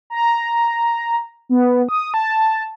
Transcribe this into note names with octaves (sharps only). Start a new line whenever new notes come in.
A#5
B3
D#6
A5